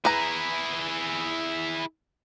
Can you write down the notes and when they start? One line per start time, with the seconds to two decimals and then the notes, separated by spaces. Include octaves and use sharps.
0.05 E4 G#4 B4 A#5